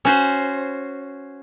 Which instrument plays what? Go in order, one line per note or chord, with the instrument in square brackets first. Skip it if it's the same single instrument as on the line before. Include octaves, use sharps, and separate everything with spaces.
[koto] C#4 F#4 C5